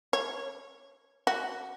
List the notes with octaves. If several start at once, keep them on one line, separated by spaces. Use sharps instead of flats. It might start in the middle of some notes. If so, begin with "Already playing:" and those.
C#5
F#4